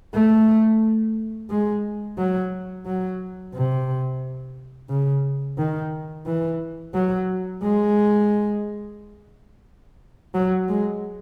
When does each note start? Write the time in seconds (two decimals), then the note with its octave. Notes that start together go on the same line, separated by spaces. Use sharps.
0.14 A3
1.50 G#3
2.18 F#3
2.86 F#3
3.54 C3
4.89 C#3
5.58 D#3
6.26 E3
6.94 F#3
7.63 G#3
10.34 F#3
10.69 G#3